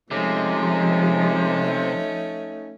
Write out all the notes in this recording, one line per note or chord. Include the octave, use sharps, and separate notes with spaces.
C3 F3 G#3 A3 C#4 D#4